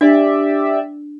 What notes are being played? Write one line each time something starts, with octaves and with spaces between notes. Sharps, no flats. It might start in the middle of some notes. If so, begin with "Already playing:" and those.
D4 G4 D5 E5